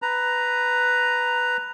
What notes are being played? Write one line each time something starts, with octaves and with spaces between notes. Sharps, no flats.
B4 A#5